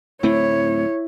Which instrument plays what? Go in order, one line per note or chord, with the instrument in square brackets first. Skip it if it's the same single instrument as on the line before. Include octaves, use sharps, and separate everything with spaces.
[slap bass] D1 A3 C4 [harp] E4 [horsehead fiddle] C#5